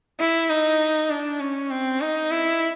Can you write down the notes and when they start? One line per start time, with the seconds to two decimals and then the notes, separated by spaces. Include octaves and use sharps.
0.19 E4
0.49 D#4
1.09 D4
1.40 C#4
1.70 C4
2.01 D#4
2.31 E4